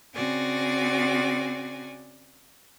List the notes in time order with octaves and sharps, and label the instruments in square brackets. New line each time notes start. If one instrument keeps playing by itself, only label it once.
[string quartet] C#3 C4 F#4 D5 G#5 A#6